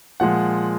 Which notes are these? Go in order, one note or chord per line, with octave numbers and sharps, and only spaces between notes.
A#2 F3 G#3 F#5